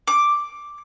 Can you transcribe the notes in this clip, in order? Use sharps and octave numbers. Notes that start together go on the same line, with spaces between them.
D6